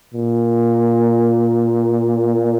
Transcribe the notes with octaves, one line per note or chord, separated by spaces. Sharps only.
A#2